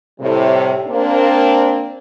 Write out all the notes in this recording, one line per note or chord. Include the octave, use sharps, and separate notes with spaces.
A2 C3 G3
A#3 C4 D4